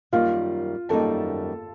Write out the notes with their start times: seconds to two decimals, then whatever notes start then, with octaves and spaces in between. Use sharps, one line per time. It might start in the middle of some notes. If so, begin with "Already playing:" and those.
0.12 F#2 D#3 G3 A#3 D#4 F4 F5
0.89 F#2 D#3 G3 A#3 D#4 A4 A5